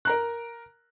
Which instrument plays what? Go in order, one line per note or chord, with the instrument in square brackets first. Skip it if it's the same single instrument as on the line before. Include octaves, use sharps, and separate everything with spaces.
[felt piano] A#4 A#5 F#6